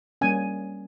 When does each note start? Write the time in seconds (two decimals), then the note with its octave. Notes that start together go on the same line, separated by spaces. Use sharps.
0.21 G3 A#3 C#4 G#5